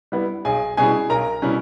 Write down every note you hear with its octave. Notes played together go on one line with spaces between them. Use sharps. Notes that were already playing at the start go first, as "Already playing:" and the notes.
G3 B3 E4
B1 G#4 G#5
B2 G3 C#4 E4 G#4 G#5
B1 A#4 A#5
B2 G3 C#4 E4